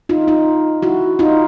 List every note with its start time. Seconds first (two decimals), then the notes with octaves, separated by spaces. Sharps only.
0.09 D#4 F4
0.28 D#4 F4
0.82 E4 F#4
1.19 D#4 F4